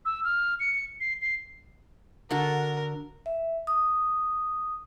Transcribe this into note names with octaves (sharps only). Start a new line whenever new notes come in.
E6
F6
C#7
C7
C7
D3 F#4 A4 A#4
E5
D#6